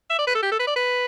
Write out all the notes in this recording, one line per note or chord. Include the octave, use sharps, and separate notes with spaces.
E5
D5
B4
A4
G4
A4
B4
D5
B4